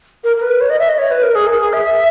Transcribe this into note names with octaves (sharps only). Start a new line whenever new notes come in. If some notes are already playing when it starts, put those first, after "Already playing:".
A#4
A#4
B4
C#5
D#5
E5
D#5
C#5
B4
A#4
G#4
A#4
G#4
E5